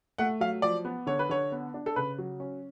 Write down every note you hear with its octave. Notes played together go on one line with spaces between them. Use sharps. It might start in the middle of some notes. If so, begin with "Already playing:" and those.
A3 F#5
F#3 F5
F3 D5
B3
D3 C#5
B4
D3 C#5
B3
D4
A4
C#3 B4
F#3
C#4